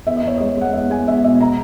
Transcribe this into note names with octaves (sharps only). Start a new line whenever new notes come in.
E2 E5
D#5
E2 C#5
G#3 D#5
G#3 F#5
E2 E5
G#3 G#5
E2 E5
B2 E5
A#5